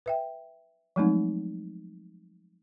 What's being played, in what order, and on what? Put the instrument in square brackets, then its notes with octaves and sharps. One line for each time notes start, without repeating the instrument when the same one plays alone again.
[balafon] B4 E5 G5
F3 F#3 G#3 A3 C4 D#4